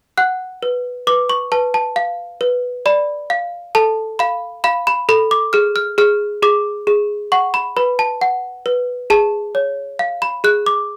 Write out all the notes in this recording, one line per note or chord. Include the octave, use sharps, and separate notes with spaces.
F#5 F#6
B4
B4 D6
C#6
B4 A5
A5
F5
B4
D5 B5
F5
A4 A5
F5 B5
F5 B5
B5
A4 B5
D6
G#4 F6
F6
G#4 F6
G#4 D6
G#4
F#5 C#6
B5
B4 B5
A5
F#5
B4
G#4 A5
C#5
F5
B5
G#4 F#6
D6